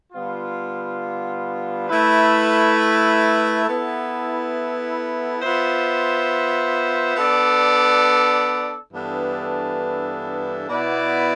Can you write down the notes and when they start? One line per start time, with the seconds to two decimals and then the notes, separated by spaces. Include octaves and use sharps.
0.13 D3 G3 B3 F4
1.89 A3 E4 B4
3.66 B3 E4 A4
5.41 B3 F4 C5 E5
7.16 B3 D4 A4 D5
8.93 G2 E3 B3 D4 A4
10.69 B2 B3 E4 B4 D5